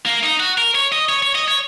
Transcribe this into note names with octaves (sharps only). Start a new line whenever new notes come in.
A#3
D#4
F#4
A#4
C#5
D#5
C#5
C#5
D#5
C#5